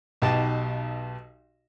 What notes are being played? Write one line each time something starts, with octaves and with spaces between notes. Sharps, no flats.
B1 B2 D#4 G4 A5